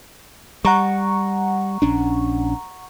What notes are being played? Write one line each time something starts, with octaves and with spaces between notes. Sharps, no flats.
G3 F#5 A#5 C#6
A#1 C#4 D4